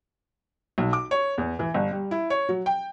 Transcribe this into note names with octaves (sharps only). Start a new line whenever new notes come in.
B1
D6
C#5
E2
E3
G1
G3
E4
C#5
F#3
G5